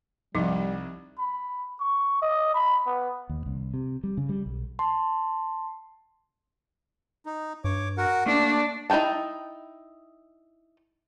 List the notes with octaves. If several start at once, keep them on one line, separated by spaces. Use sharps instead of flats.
C2 F3 G3 D#4
B5
C#6
D#5
B5
B3
D#2
C2
C3
G3
C#3
G3
B1
A5 C6
D#4
G2 C#5 D6
F#4 A#4 F#5
A3 A#3 D4
D#4 E4 A#4 G5 A5